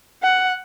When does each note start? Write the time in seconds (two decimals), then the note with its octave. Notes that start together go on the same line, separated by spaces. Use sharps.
0.23 F#5